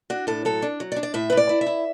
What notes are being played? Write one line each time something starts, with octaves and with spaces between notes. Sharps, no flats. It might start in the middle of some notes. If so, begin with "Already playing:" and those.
D4 F#4
A2 A4
F#3 A4
D4
F#3
D5
D4
D5
A2 E5
B4
A2
D5
E4
E5
E4